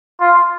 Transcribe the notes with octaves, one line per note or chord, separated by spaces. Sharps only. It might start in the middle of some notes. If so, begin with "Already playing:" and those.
F4